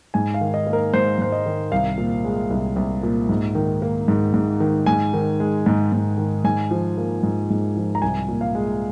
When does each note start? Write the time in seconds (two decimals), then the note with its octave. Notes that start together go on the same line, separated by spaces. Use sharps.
0.14 G#2 G#5
0.34 F5
0.41 D#3
0.54 D#5
0.67 A#3
0.73 A#4
0.93 G#2 C5
1.19 G#2 C5
1.32 D#5
1.46 D#3
1.72 C2 F5
1.98 A#2
2.25 G#3
2.51 C2
2.76 C2
3.03 A#2
3.29 G#2
3.55 D#3
3.82 A#3
4.08 G#2
4.34 G#2
4.60 D#3
4.86 G#2 G#5
5.14 D#3
5.40 G#3
5.66 G#2
5.92 G#2
6.18 D#3
6.44 G#2 G#5
6.71 F3
6.98 A#3
7.23 G#2
7.50 G#2
7.77 F3
7.95 A#5
8.02 C2 G#5
8.28 A#2
8.41 F5
8.55 G#3